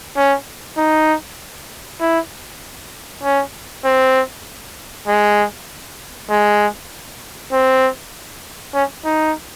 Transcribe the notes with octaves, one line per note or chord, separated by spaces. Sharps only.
C#4
D#4
E4
C#4
C4
G#3
G#3
C4
C#4
D#4